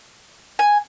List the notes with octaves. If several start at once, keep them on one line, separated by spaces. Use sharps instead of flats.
G#5